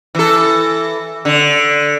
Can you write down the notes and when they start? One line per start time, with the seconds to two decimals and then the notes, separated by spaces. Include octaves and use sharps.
0.15 E3 A4
1.25 D3